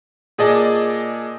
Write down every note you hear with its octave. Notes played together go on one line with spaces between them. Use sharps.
A#2 G#4 D5 D#5 A5